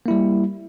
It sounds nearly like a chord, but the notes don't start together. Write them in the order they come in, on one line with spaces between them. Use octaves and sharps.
A#3 E4 G3